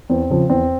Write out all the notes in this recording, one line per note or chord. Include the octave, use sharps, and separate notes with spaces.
E2 C4
C#3 F3
E2 C4